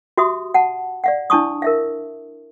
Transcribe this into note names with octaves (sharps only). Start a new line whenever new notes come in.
F#4 G4 E5 C6 D#6
F#5 A5
D5 F5 F#5
D4 E4 A5 C#6 D#6
A#4 E5 F5